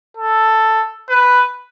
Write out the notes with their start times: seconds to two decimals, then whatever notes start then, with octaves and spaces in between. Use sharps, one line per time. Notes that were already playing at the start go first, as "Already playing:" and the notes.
0.17 A4
1.09 B4